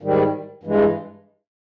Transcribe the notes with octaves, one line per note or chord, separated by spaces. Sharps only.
G#2 D#3 G3
G2 E3 G#3